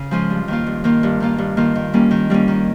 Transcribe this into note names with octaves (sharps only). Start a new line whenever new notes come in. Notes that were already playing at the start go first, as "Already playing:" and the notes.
Already playing: C#3
F3 G#3 C#4 F4
G2
D#3 A#3 F4
G2
D#3 A#3 F4
G2
D#3 A#3 F4
G2
D#3 A#3 F4
D#3
G3 A#3 C#4
D#3
G3 A#3 C#4
D#3